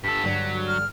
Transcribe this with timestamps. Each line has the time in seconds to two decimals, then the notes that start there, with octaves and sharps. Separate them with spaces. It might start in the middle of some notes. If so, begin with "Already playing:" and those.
0.04 G2 A4 B6
0.24 G2 D3 F#3 D5
0.67 F6